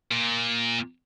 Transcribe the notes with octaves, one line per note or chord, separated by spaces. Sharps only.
A#2